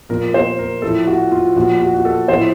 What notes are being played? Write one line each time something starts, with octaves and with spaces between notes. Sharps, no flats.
A#2 F3 A#4
C5
A#4
A2 F3 A4
F#4
F4
A#2 F3 F#4
F#4
F#4
A4
A2 F3 C5